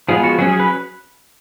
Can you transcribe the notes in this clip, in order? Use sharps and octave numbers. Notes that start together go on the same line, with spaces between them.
F3 G#3 B3 G#4
F#4
F#3 C#4 G#4
G#4
B4